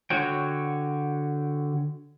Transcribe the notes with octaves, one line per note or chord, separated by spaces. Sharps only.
D3 F#4 C#5 G5